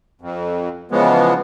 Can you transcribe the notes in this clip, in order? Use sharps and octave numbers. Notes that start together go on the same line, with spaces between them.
F2
C#3 E3 F3 G#3 B3